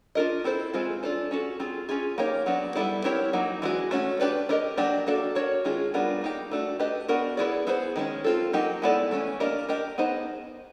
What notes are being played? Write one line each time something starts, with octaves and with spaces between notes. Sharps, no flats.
D4 F4 A#4 D#5
C4 E4 A4 C5
E3 G#3 C4 F4 G#4
D4 F4 A4 C5
C#4 F#4 A4
C4 F4 G#4
C#4 F4 G#4
A#3 D#4 G4 A#4 C#5
F#3 B3 D4
G3 B3 E4 A4 D5
C4 E4 G4 A#4 C#5
F#3 A#3 D#4
E3 G#3 B3 D4 F#4
A3 C#4 F#4
D4 G4 B4 D5
D4 G4 A#4 D#5
F#3 A#3 D4 G4
A#3 D4 F#4 A4 D5
D4 F#4 A#4 C#5
D#3 G#3 C#4 F4 G#4
G3 B3 D4 F4 A#4
A#3 D#4 G4
A3 D4 F#4
D4 G4 B4 D#5
B3 D4 F#4 A#4
B3 E4 G#4 B4 D5
B3 E4 G#4 C5
D#3 G#3 C#4
C4 F4 A4
F#3 A#3 D#4 G4
G#3 B3 E4 A4 D5
E3 A3 C#4
A#3 D4 G4 A#4 D#5
D4 G4 A#4 D#5
B3 D#4 G#4 C5 D#5